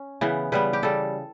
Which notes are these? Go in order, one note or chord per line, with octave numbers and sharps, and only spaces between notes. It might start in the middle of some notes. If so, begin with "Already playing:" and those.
Already playing: C#4
C#3 E3 B3
C#3 G3 B3 B4
G4
C#3 G3 A4